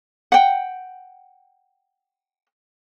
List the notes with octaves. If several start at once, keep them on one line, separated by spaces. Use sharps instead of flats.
F#5 G5